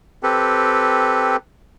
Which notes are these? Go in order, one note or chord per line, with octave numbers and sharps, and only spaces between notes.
C4 G4 A4 B4